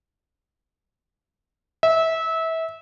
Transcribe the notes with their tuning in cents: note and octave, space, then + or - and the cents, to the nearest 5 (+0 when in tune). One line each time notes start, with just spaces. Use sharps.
E5 -25